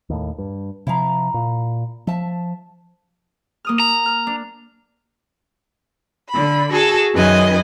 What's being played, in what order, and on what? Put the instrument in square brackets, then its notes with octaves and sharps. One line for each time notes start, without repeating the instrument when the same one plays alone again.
[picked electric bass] D#2 A2
G2
[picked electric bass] C3 F3 [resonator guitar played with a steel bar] E4 F5 A#5
[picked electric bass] A#2
[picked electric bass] F3 [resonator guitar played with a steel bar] E5 A5
[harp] A#3 D#6 F6
[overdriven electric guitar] A#5
[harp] F6
D4
[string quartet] D3 B5
F#4 G#4 A4
F#2 D#3 B4 D#5 G#5